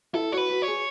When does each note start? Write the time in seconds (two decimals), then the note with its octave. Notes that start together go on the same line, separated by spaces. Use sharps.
0.14 E4 A4
0.32 F#4 C#5
0.37 B4
0.49 F#4
0.62 C#5
0.68 G#4